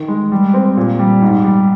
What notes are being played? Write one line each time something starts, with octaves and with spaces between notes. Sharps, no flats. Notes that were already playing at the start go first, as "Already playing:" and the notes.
Already playing: D#3
G#3
G3
C4
A#2
G3
G#2
G3